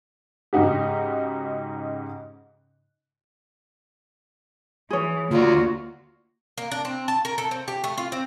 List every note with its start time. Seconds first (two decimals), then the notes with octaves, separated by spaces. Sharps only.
0.53 G#2 C#3 D#4 F#4 G4
4.90 E3 G#4 C#5
5.31 D2 A#3 F4 F#4 D5
6.58 A#3
6.71 D4
6.85 C4
7.08 A5
7.25 A#4
7.38 A4
7.51 C4
7.68 G4
7.84 A3
7.98 F4
8.12 C4